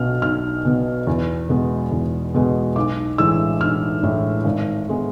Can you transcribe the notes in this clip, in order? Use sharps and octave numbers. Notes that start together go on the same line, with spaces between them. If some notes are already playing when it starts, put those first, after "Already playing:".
Already playing: B1 B2 B3 F6
B1 F6
B2 B3
E2
B2 G#3 B3
E2
B2 G#3 B3
B1 D6
A2 E3 G#3 D4 E6
B1 F6
A2 E3 G#3 D4
G#1
G#3 B3